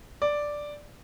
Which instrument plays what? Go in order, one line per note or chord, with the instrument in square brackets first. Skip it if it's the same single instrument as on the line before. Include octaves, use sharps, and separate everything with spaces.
[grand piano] D5